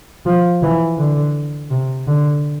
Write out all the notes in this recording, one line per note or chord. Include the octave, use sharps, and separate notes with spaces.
F3
E3
D3
C3
D3